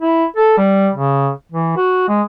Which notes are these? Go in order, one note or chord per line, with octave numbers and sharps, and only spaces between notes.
E4
A4
G3
C#3
E3
F#4
G#3